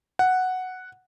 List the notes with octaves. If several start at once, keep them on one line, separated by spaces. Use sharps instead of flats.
F#5